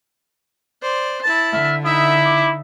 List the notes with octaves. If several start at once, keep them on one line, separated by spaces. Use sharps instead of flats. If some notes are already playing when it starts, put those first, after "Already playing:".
C5 D5
E4 A5 A6
D3 E5 F6
D#4 E4 E5 D#6
D6